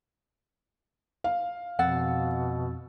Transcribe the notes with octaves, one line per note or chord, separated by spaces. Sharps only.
F5
F2 B2 F#5 E6 A6